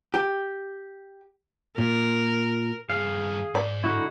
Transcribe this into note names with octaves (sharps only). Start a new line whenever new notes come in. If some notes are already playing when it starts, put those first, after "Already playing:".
G4
A#2 A#4
G2 D#3 G#4 F5
G#2 D5
D3 D#4 E4 F#4